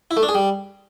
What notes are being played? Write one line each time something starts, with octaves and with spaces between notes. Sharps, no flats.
E4
A3
D4
G#4
G3